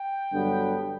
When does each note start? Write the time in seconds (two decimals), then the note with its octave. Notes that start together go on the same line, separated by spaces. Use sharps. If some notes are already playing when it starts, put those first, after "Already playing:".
Already playing: G5
0.32 G2 D3 F#3 B3